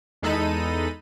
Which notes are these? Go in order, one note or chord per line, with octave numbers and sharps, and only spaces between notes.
E2 G#3 D#4 A4 B5 D#7